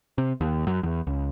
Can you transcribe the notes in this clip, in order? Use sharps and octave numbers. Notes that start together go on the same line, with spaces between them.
C3
D#2
F#2
E2
C#2